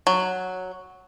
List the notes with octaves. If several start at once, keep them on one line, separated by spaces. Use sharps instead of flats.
F#3